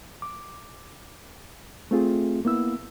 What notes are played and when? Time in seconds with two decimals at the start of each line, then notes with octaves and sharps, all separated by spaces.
0.22 D6
1.91 A3 C4 F4 G#4
2.45 A#3 B3 E4 E6